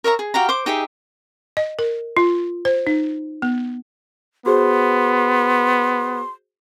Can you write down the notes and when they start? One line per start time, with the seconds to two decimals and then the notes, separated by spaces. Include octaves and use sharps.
0.04 A#4 C#5 E5 A#5
0.19 G#4
0.34 F#4 G4 F5 A#5
0.49 C5 D6
0.66 D#4 G4 G#4 E5
1.57 D#5
1.79 A#4
2.17 F4
2.65 C5
2.87 D#4
3.42 B3
4.46 B3 F#4 G#4 C5 C6